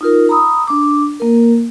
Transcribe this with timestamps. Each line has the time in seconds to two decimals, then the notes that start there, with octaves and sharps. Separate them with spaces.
0.01 D#4 F4 A#4
0.29 A#5 B5 D#6 E6
0.67 D4 D6
1.20 A#3 A#4